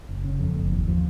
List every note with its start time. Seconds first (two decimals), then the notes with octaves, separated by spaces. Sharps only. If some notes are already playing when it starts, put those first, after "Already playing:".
0.09 F#1
0.24 C#3
0.40 F2
0.55 F#1
0.72 D#2
0.88 F3